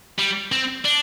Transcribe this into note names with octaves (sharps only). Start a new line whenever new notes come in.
G3
C4
D4